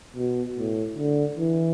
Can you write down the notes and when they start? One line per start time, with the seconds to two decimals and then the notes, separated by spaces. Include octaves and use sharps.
0.16 B2
0.57 A2
0.96 D3
1.37 E3